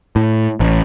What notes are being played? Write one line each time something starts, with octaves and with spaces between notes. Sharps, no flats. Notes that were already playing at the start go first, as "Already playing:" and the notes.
A2
A1